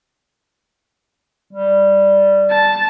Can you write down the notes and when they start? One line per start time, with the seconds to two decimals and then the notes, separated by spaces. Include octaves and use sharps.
1.53 G3
2.50 A5